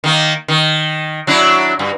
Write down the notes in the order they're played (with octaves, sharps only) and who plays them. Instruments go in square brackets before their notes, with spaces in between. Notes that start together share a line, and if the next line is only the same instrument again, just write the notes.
[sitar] D#3 A#3
D#3
F#3 D4 E4
G2